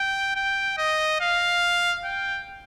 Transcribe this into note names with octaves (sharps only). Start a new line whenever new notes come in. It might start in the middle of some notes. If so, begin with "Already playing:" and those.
Already playing: G5
G5
D#5
F5
G5